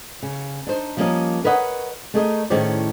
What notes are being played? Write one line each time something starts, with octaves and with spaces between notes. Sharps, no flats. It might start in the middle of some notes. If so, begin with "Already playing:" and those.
C#3
D4 D#4 C5
F3 G3 A#3 C#4 A#4 D#5
A#4 B4 C#5 D#5 F5 F#5
A3 D#4 G#4 A#4 D#5
A2 D#3 C#4 G#4 C5 D5